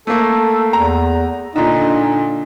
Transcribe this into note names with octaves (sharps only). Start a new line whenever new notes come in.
A3 A#3 A4
E2 A#5
A#2 D3 D#4